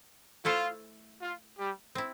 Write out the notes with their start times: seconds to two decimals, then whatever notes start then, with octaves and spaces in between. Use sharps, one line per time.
0.45 A3 E4 F4 A4 C5
1.22 F4
1.59 G3 G4
1.95 C4 E4